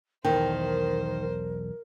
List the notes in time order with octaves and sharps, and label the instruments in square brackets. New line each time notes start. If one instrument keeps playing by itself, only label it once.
[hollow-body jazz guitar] B1 E2 G5 [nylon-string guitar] D#3 [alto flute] A#4 [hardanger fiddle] C5